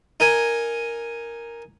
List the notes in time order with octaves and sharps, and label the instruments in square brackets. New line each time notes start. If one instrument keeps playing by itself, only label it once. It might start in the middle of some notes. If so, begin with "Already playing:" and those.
[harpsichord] D#4 A#4 G#5